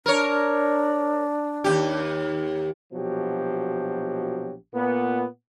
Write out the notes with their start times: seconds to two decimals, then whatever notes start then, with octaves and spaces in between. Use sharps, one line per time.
0.06 D4 A#4 C#5
1.64 D#2 C3 G4
2.93 A#1 B2 F3 F#3 G4
4.74 A#2 B3